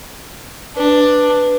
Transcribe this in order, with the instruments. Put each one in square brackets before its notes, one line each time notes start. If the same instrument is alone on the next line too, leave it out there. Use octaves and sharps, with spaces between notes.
[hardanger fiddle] D4 [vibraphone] B4